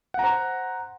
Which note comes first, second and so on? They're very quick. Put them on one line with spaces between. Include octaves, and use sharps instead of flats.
F#5 A#5 C5